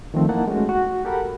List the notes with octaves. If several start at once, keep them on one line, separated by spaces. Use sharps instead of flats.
D#3 F3 A3 C4
A#3 D#4 E4 F#5 A5
G#3 A3 C#4 F#4
F#4
G4 A4 A#4 F#5 B5